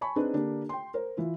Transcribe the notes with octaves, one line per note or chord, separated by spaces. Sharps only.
G#5 A5 B5 C#6
C4 D4 D#4 G#4 B4
D3 A#3 D4 G4
G5 C6
A#4 C5
E3 E4 F4